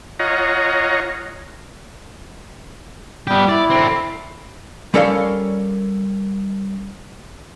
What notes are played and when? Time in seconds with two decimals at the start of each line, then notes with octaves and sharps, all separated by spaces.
0.19 F4 C#5 D#5 F#5 A#5
3.27 G3 B3 G4
3.49 E4 D5
3.70 D3 C4
4.94 G3 C#4 A4 A#4 C#5 F5